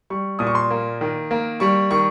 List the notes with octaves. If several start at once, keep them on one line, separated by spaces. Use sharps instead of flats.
G3 C#6
A#2 D#6
C#6
C6
A#3
D#3
A#3
G3 C#6
D#3 C#6